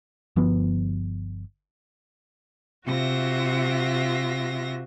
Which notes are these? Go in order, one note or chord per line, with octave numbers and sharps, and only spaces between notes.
G1 F3 B3
C3 F4 F#4 E5 A#6